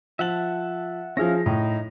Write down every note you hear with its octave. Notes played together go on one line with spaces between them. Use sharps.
F3 E5 F#5 A5 F#7
F3 C#4 E4 G#4 F5 A#6
A2 D#4